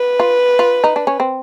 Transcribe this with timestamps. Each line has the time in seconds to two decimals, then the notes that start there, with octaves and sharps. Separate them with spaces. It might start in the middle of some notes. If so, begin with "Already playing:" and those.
Already playing: B4
0.20 F4
0.59 F4
0.84 D#4
0.96 D4
1.07 C#4
1.20 C4